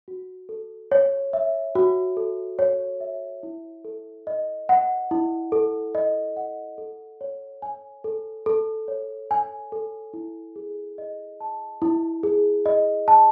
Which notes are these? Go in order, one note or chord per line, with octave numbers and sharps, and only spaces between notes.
F#4
A4
C#5
E5
F#4
A4
C#5
E5
E4
A4
D#5
F#5
E4
A4
D#5
F#5
A4
C#5
G#5
A4
A4
C#5
G#5
A4
E4
G#4
D#5
A5
E4
G#4
D#5
A5